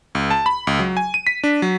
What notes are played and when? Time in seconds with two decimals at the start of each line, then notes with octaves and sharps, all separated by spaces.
0.15 C#2
0.31 A5
0.46 B5
0.67 C#2
0.79 F#3
0.97 G#5
1.14 D#7
1.27 B6
1.44 D4
1.62 F#3